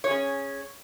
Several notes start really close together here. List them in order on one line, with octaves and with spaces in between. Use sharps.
C#5 G#4 C#4